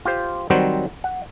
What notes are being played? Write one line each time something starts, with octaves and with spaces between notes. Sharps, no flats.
F4 G4 C5
D#3 F#3 G3 C4 F#4 C5
F#5